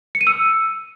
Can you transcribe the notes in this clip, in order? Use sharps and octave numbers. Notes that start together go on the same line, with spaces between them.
C#7
D#7
E6